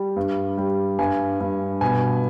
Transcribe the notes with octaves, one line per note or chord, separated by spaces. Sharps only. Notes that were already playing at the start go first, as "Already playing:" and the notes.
Already playing: G3
G2
G3
G2 G#5
G2
B2 G#5